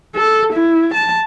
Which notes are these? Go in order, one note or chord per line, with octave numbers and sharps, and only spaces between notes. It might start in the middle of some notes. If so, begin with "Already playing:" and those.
A4
E4
A5